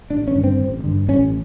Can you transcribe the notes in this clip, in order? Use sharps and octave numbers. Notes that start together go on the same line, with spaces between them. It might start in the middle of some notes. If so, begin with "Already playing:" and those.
A1 D4
C#4
G2 D3
C4
A1
G2 D3
A1 C#4